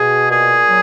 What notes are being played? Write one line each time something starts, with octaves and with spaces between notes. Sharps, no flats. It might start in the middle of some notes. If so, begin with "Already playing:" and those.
Already playing: B2 G#4
A#2 G#4
F#3